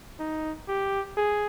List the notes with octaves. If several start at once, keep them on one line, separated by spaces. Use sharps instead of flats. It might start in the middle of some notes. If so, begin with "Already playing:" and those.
D#4
G4
G#4